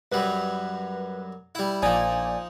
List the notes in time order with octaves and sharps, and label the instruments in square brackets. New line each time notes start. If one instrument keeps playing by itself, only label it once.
[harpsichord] F#2 F#3 G3 [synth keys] B4
[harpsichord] G3 E4
[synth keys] A#1 D5 G#5 [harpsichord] F3 D#4